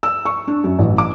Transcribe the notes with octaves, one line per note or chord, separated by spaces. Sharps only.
E6
C#6
D4
F#2
A1
D6